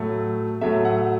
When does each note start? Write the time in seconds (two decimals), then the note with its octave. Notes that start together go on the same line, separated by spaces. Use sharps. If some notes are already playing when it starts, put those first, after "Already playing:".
Already playing: A2 F#3 A3
0.61 A2 F#3 A3 E5
0.85 F#5